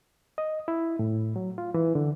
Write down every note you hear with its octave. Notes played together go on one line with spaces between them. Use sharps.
D#5
E4
A2
F#3
F4
E3
D3